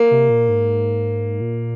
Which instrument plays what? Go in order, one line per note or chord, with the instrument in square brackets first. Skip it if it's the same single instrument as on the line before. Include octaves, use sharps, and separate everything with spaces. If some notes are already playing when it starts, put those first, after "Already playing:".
Already playing: [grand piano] A#3
[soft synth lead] C3
A#2
G#2
A#2